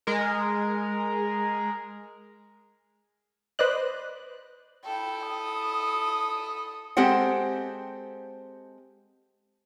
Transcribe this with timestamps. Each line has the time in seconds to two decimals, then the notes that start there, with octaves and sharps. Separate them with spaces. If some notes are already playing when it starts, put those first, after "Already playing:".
0.07 G#3 A#4
3.59 B4 C5 D5 D#5 F#6
4.85 E4 A4 G5
5.30 D#6
6.97 G#3 C4 G4 A4 C5 F#5